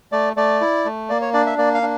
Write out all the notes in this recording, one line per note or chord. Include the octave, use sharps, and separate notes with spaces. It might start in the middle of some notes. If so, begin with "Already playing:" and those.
A3 D5
A3 D5
E4
A3
A#3 D5
C#5
D4 D5
E5
A#3 D5
F5
D4